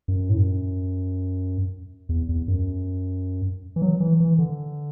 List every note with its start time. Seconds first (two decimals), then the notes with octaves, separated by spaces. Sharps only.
0.08 F#2
0.29 A2
0.37 F#2
2.09 E2
2.29 E2
2.48 F#2
3.76 E3
3.82 F#3
4.00 E3
4.20 E3
4.39 D3